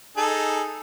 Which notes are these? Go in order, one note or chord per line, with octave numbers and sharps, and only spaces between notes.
D#4 G#4 A4